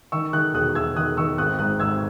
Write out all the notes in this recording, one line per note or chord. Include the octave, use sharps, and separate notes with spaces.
D#3 C#6 E6
D#3 D#6 F#6
E1 D#6 F#6
E1 E6 G#6
D#3 D#6 F#6
D#3 C#6 E6
G#1 D#6 F#6
G#2 D#6 F#6
G#1 E6 G#6